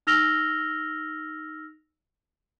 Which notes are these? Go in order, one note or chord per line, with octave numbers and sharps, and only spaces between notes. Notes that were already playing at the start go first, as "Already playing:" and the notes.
D#4 E6 F6 A#6 F7 G7